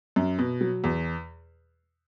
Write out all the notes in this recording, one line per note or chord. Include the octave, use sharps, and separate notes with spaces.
F#2
B2
F#3
E2